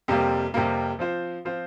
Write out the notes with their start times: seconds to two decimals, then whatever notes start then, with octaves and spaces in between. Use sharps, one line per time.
0.08 F2 C3 G3 A#3
0.54 F2 C3 G3 A#3
0.99 F3 C4 F4 C5
1.45 F3 C4 F4 C5